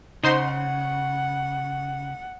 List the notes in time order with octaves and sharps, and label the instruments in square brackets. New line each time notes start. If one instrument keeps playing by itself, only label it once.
[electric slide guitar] C#3 [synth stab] D#4 C5 C6 [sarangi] F#5